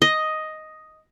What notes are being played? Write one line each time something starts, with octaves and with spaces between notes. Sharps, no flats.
D#5